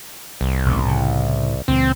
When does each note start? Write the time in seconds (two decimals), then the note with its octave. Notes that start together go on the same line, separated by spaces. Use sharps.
0.41 C2
0.66 E1 A1 A2
0.84 A2 C#3
1.68 C#2 A#2 E3 C4